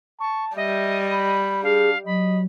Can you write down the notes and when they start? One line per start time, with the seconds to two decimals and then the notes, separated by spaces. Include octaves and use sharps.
0.20 A5 C#6
0.56 G3 D#5 E5
1.11 B5
1.63 D4 G#4 F5
2.06 F#3 D#5 B5